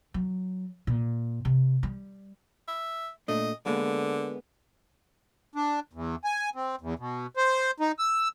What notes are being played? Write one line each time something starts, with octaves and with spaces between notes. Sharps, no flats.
F#3
A#2
C3
G3
E5
A#2 A3 D4 D#5
D3 G#3 A#3 B3
D4
E2
G#5
C4
E2
B2
C5
D#4
E6